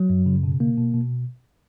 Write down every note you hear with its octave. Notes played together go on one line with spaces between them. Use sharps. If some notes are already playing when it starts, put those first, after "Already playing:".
Already playing: F#3
F#2
C#3
B2
A#3
B2
B2